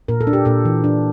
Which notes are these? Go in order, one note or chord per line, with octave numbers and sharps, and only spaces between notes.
A#2 A#4
A4
D4
G4
A#2 A4
E3
D4